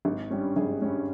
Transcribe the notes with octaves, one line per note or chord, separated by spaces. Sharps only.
G#1
G2 G3 C#4
G#1 G#4
G2 G3 C#4